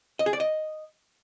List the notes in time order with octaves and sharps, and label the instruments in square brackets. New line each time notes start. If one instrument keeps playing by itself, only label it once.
[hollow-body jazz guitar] D#5
G#4
D5
D#5